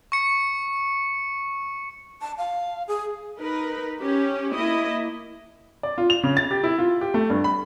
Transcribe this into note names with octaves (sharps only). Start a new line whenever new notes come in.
C#6 C#7
A5
F5
G#4
D#4 A#4 B4
C#4 G4
A#3 E4 D#5
D5
F4
F7
C#3
A6
G4
E4
F4
G4
A3
G2
B5